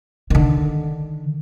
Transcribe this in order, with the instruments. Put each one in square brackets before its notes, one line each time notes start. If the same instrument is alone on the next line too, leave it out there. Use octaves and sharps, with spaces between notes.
[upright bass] D3 D#3